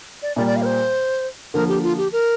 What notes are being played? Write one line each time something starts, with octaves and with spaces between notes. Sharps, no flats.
D5
A#2 G3 A#3 D5
D5
F5
A#4
C5
D3 F3 A#3 A#4
G4
F4
G4
A#4